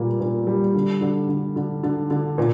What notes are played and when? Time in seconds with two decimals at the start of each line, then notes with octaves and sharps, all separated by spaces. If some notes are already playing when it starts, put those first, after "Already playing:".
Already playing: A#2 G3 A#3
0.20 A#2
0.47 G3
0.74 D3
1.01 D3
1.29 D3
1.56 D3
1.83 D3
2.11 D3
2.38 A#2